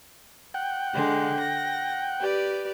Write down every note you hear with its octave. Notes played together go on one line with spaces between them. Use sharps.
F#5 G5
D3 G#3
A#6
G4 B4 D5